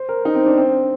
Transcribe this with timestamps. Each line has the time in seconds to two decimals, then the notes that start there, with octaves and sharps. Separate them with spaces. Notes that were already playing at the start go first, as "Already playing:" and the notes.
Already playing: C5
0.09 A#4
0.25 D#4
0.35 C4
0.46 D4
0.57 C4